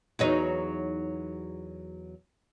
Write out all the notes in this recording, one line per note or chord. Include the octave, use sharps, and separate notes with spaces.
E2 F#3 D#4